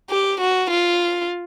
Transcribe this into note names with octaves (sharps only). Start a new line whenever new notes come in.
G4
F#4
F4